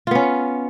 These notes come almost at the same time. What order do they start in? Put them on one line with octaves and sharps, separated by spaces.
F4 B3 C#4